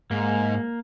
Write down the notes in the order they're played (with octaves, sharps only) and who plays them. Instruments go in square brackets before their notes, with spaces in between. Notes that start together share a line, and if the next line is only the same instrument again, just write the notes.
[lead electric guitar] G#2 [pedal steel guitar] A#3